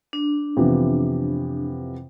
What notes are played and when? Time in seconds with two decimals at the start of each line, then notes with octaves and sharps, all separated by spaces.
0.13 D4
0.56 F2 C3 E3 B3 F4